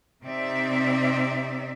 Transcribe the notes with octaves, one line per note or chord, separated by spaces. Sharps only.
C3 C4 D#4 D5 E5